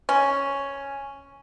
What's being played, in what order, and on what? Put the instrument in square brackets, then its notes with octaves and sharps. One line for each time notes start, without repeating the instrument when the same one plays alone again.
[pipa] C#4